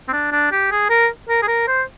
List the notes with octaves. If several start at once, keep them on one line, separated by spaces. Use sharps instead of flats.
C4
D4
D4
G4
G#4
A#4
A#4
G#4
A#4
C5